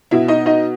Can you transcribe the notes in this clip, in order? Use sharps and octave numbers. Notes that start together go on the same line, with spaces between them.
B2 E4 E5
D#4 D#5
D#4 D#5